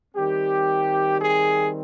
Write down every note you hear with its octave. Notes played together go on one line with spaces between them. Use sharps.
D#3 G3 C4 G4
G#4